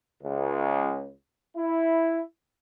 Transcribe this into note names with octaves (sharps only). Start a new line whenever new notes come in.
C#2
E4